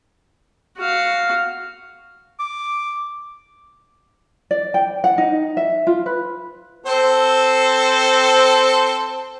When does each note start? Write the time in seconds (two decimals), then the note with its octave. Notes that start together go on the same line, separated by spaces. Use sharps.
0.78 F#4 F5
2.40 D6
4.51 D5
4.74 G5
5.04 F#5
5.18 D#4
5.57 E5
5.87 F4
6.06 B4
6.86 C4 A4 C5